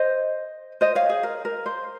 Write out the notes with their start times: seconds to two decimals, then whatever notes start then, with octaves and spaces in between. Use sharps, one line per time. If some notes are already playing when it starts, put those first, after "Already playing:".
Already playing: C5 D#5
0.81 C5 D#5
0.95 C#5 F5
1.09 G#4
1.23 A#4
1.45 A#4
1.66 C5